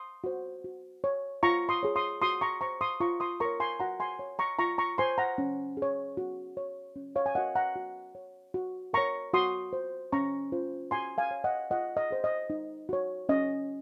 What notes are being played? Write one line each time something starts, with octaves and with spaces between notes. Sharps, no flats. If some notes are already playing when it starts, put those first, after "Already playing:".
Already playing: C6 D#6
F#4 C5
F#4
C#5
F4 A#5 C#6
C6 D#6
G#4 C#5
C6 D#6
F#4 C6 D#6
A#5 C#6
C5 A#5 C#6
C6 D#6
F4 A#5 C#6
C6 D#6
A#4 C#5 A#5 C#6
G#5 C6
F#4 F#5 A#5
G#5 C6
C#5
A#5 C#6
F4 A#5 C#6
A#5 C#6
C5 G#5 C6
F#5 A#5
C#4
G#4
C#5
F#4
C#5
C#4
C#5 F5
G#5
F#4 A#4 D#5 F#5
F#5 A#5
F#4
C#5
F#4
A#4 C#5 A#5 C#6
F#4 C6 D#6
C5
C#4 A#5 C#6
F4 C5
F#4 G#5 C6
F5 G#5
C#5
D#5 F#5
F4 D#5 F#5
D#5
G#4 C5
D#5
D#4
F#4 C#5
C#4 D#5